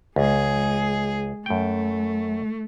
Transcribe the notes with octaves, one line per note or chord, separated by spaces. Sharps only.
C#2 G#3 G#4
F#2 A3 G5